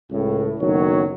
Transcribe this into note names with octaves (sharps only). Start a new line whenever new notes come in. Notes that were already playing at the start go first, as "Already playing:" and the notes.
C#2 A2
F#1 B1 D#3 F#3 F#4 C#5